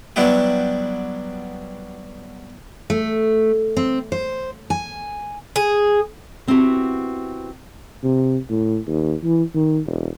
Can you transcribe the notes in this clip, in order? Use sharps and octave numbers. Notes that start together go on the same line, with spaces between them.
F#3 G3 B3 D4 E4 G4
A3
C4
C5
G#5
G#4
B3 C4 D4 E4 F#4 G4
C3
A2
D#2
E3
D#3
E1